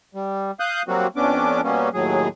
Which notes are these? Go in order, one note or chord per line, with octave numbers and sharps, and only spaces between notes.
G3
F5 D#6 F#6 G6
F#3 G3 A#3 C4 F#4
F2 B3 C#4 D4 D6
B2 G3 A#3 B3 C#4
D#2 A2 F#3 G#4